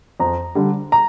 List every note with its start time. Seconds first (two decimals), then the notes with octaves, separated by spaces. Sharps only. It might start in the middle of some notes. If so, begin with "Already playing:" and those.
0.20 F2 A#5
0.55 D3 G3
0.92 A#5